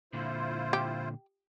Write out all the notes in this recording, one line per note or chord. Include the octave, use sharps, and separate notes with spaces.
A#2 D3 E4 F4 C5
G4